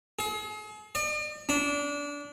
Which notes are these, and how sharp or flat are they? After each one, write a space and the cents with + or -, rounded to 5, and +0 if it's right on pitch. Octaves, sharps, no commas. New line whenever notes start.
G#4 +40
D5 +45
D4 -25